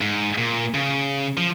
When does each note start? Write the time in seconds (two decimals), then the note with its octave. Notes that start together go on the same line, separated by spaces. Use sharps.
0.01 G#2
0.38 A#2
0.74 C#3
1.37 F3